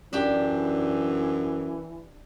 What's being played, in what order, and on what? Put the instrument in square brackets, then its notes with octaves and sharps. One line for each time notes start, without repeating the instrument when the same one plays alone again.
[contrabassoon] F#2 [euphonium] E3 [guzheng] D4 G4